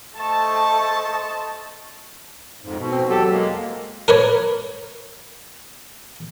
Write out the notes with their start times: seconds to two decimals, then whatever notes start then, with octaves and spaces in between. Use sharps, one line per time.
0.17 A3 C5 D#5 A5 C#6
2.62 F2 G#2
2.78 B2
2.92 C4
3.09 E2 F#3 G4 A4
3.31 G#3 A#3
4.08 A#4 B4 C#5